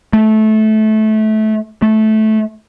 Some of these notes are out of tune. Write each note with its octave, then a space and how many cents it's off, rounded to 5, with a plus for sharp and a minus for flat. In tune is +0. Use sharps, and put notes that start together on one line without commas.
A3 -20
A3 -15